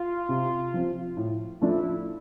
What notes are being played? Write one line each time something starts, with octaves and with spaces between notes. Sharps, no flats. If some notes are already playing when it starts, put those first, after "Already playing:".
Already playing: F4
C3
F3 C4
A2
F3 A3 D4 E4 F4